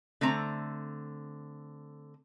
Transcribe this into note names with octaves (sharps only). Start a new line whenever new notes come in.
D3 A3 C4 A#5